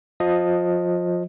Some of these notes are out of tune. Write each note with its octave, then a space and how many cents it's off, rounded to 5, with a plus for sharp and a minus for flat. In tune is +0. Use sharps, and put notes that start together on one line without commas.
F3 +20 D#5 +0